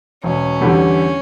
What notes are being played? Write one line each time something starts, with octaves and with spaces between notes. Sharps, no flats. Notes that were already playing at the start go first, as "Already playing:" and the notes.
E1 C#4
E2 D3 G3